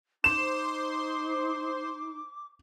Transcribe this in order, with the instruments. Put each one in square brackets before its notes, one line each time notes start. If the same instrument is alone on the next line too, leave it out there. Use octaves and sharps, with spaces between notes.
[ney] D#4 [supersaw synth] C5 C6 [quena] D6 [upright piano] E7